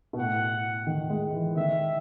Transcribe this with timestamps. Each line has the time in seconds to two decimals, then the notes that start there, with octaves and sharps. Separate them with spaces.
0.13 B2
0.17 A2 F#5
0.87 D#3
1.10 G#3
1.34 E3
1.57 D#3 E5